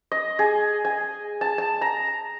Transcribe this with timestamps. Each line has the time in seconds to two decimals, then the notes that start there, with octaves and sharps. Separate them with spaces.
0.12 D#5
0.39 G#4
0.85 G#5
1.41 A5
1.58 A5
1.81 A#5